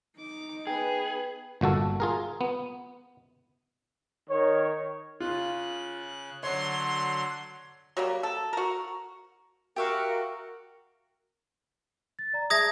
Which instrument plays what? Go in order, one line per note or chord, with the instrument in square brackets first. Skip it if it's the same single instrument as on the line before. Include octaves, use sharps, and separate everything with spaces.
[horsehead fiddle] D#4 [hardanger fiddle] D6
[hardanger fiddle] B3 B4 [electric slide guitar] G#4 [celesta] G5
[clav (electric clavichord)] G1 A#2 F#4 A4
F4 G#4 A#4
B3
[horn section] D#3 C#5
[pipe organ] C#3 F#6 [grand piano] F4
[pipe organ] D3 F#3 [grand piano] C#5 [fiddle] C6
[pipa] F#3 G3 A#3
A4
F#4 A#4
[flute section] F#4 A#4 [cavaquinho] G4 E5 F5
[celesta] A6
D5 A#5
[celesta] G#4 E5 A5 [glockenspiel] D#6 G#6 A#6